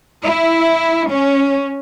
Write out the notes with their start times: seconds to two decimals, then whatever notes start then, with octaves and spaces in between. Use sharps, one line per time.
0.23 E4
1.08 C#4